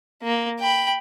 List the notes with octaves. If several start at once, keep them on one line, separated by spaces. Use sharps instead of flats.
A#3
G5 B5